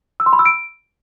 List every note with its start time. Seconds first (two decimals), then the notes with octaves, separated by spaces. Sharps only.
0.20 E6
0.26 C6
0.33 B5
0.39 E6
0.46 D7